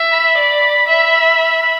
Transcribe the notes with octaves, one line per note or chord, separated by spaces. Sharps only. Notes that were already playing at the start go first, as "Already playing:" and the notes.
Already playing: E5
B5
D5
E5
B5
B5